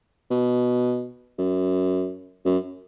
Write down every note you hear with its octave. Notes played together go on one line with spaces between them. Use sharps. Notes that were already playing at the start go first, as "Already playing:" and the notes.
B2
F#2
F#2